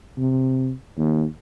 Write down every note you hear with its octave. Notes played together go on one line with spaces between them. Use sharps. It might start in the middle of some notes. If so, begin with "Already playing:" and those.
C3
D#2